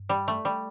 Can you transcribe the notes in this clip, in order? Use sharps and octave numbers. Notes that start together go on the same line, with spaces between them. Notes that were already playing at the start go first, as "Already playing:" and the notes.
Already playing: G2
G3
A3
G3